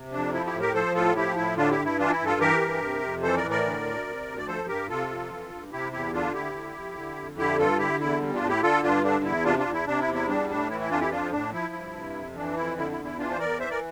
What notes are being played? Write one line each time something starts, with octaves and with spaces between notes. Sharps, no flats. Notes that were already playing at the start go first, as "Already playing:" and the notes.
Already playing: C3
F2 D4
F3 E4
E4 G4
A2
G4 A#4
F3 A4 C5
A2 F4 A4
F3 E4 G4
A2 E4
D3 D4 F4
E4 G4
G2
E4
E3 D4 F4
E4
G2
F4 A4
E3 G4 A#4
G2
C3
F2
E3 A4 C5
A#4 D5
A2
A#4 D5
D3
D2
C3
D2
D5
F3 A4 C5
G2 G4 A#4
C3 F4 A4
F2
E3
G2
C3 E4 G4
E2 E4 G4
D3 D4 F4
D2 E4 G4
D3
F2
D3
F2
D3 E4 G4
G2 F4 A4
D3 E4 G4
E2 E4
G3
D4 F4
A2
E4 G4
D3 F4 A4
G2 D4 F4
D3 D4
E2 E4
C3 D4 F4
D4 F4
E2
E4
C3 D4
E4
E2
E4
G3 D4
A2 D4
E3 E4
E4
F2 D4 F4
E4 G4
F3 D4 F4
A2 D4
F3 E4
G2
C3
F2
E3 D4
F2 E4
D3 E4
E4
E2
E4
E3 D4 F4
C5
E2 A#4 D5
E3 C5 E5
A#4 D5